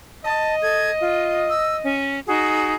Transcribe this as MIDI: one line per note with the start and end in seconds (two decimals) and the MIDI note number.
0.25 1.91 75
0.25 0.55 81
0.63 0.90 69
0.63 0.90 92
1.00 1.50 65
1.50 1.77 88
1.84 2.20 61
2.28 2.74 63
2.28 2.74 66
2.28 2.74 68